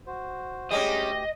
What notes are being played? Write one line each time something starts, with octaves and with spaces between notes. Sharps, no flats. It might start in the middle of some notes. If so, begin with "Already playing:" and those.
F#4 C5
D2 G3 G#3 C#4 G4 D#5